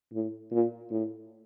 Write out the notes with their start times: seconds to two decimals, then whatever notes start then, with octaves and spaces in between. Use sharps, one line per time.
0.13 A2
0.52 A#2
0.90 A2